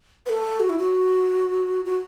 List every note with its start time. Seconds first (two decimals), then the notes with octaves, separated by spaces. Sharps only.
0.26 B4
0.30 A4
0.60 F#4
0.69 E4
0.78 F#4
1.85 F#4